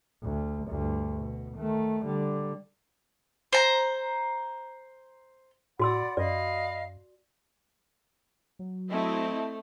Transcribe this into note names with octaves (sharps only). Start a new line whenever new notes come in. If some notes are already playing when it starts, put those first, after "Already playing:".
D2
D2 G2
B2
D#3 A3
D3 G3
C5 A#5
A2 F#4 D5 F#5 B5 C6 E6
F#2 D5 D#5 F5 B5
F#3
A3 C4 E4 D#5